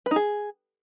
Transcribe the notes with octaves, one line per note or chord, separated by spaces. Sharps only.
B4
D#4
G#4